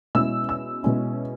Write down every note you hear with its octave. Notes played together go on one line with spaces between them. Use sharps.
B2 G#3 C#4 E4 E6
E6
B2 G#3 C#4 E4